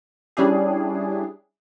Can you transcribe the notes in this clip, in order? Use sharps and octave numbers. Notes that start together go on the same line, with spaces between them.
G3 C#4 D4 E4 G4 G#4